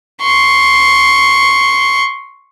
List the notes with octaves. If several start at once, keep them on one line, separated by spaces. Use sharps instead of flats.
C6 C#6